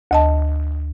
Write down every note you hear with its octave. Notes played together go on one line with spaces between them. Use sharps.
D2 D#5 A5